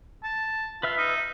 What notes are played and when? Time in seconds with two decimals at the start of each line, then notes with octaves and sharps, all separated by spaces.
0.24 A5
0.83 F4 B4 E5 F6
0.98 D#4